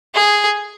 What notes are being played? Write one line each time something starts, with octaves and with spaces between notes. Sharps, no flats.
G#4